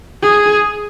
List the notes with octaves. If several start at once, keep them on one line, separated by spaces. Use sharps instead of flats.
G#4